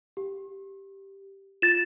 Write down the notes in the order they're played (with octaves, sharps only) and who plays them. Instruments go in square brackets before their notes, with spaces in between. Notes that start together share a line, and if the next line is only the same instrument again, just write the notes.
[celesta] G4
[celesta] F4 [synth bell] A6 E7